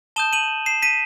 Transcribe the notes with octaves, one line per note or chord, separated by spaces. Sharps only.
A5 D#6 G6 E7 G7
D#7 F#7
C7 E7
B6 D#7